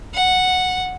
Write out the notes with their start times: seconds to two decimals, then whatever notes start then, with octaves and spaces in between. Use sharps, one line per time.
0.14 F#5